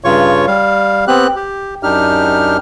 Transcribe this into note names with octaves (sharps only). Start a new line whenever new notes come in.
G2 C#3 F4 C#5 C#6
G3 F5
B3 C4 G4 F#6
G4
F#2 D4 D#4 G4 F6